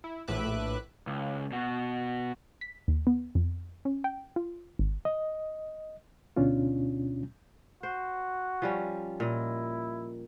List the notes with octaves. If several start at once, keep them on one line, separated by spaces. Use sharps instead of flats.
E4
A#1 A2 B4 E5 D6 F#6
C#2
B2 F#4
B6
D#2
B3
F2
C#4
G5
F4
G#1
D#5
D2 B2 C#4 D4 F4
F#4 C5
F3 G3 C#4
A#2 E4 D#5